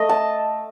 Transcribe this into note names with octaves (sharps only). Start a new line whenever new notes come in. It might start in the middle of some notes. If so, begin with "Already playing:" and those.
Already playing: A3 D#5
A5